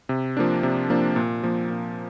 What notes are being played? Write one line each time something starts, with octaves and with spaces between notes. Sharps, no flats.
C3
F3 A#3 D4
C3
F3 A#3 D4
A#2
F3 A#3
A#2